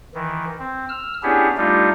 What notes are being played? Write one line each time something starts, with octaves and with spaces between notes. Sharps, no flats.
D#3 E3
C4
E6 F6
B3 C#4 D4 E4 G4 G#4
G3 A3 D4 D#4 F4 G4